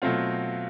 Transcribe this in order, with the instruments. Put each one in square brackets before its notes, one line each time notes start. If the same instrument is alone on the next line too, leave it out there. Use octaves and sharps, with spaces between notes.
[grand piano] B2 F#3 A3 C4 F4